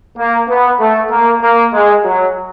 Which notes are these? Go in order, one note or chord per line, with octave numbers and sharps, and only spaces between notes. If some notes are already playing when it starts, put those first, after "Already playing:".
A#3
B3
A3
A#3
A#3
G#3
F#3